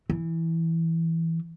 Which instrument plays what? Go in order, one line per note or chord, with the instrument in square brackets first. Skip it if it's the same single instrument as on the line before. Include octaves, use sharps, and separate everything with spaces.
[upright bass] E3